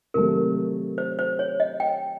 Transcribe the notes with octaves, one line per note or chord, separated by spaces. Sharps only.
C3 D#3 F#3 A3 A#4
C5
C5
C#5
D#5
G5